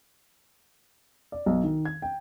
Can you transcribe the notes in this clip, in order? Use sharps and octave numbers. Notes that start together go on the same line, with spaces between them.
D5
B1
D#3
G#6
G5